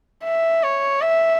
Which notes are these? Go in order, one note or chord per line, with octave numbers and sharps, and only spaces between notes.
E5
C#5
E5